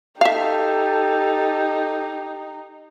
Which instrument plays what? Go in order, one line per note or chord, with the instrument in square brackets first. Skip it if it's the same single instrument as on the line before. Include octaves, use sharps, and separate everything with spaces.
[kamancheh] D#4 [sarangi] G4 [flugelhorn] A4 [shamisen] E5 F5